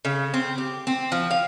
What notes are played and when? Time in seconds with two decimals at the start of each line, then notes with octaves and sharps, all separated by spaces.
0.05 C#3
0.34 C4
0.58 G4
0.87 C4
1.12 F3
1.31 F5